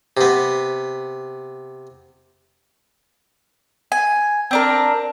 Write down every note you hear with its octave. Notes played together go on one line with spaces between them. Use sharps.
C3 B3
G#5
C4 D4 A#4